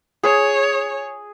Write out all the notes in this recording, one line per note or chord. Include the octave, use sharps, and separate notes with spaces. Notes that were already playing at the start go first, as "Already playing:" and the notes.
G#4 C#5